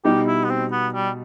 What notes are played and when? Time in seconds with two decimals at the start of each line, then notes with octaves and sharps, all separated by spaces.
0.04 B2 G3 D#4 G4
0.27 E4
0.44 B3
0.49 C4
0.72 B3
0.94 G3